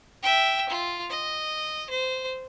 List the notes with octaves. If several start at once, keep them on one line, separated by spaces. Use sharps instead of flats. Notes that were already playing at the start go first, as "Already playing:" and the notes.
E5 G5
F4
D#5
C5